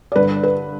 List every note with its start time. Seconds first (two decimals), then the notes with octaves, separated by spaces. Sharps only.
0.12 D5
0.16 G2 D3 B4
0.43 B4